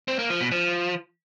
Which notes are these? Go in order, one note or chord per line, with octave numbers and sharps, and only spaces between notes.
C4
A#3
F3
B2
F3